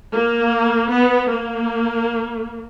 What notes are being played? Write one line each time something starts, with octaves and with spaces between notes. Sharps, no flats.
A#3
B3
A#3